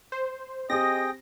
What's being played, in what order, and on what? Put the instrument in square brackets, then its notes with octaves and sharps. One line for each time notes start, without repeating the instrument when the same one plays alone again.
[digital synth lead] C5
[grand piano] C4 G4 [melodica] G#4 G5 [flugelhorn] D#5 [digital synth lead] A#6